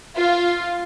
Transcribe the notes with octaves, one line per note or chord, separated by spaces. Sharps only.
F4